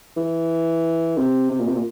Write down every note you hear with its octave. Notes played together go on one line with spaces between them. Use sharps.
E3
C3
C3
A#2
C3
A#2